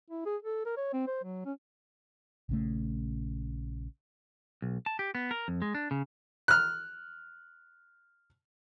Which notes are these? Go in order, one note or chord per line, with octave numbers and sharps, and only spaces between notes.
E4
G#4
A4
A#4
C#5
C4
C5
F#3
C#4
A#1 C#3 A3
B1
A5
G4
B3
A#4
F2
G#3
D4
C#3
F6 F#6